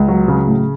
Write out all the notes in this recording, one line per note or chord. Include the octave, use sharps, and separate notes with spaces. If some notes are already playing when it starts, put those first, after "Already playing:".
Already playing: C#2
F#3
C#3
A2